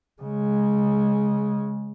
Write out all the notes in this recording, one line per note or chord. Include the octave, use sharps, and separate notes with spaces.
C#3 G#3